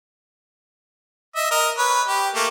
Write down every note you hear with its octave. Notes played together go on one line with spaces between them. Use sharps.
D#5 E5
A#4 D#5
B4 C#5
G4
A3 A#3